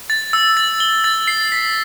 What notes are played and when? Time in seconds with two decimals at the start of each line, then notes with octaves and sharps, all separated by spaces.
0.10 A6
0.33 E6
0.57 A6
0.80 G7
1.04 A6
1.28 C7
1.52 B6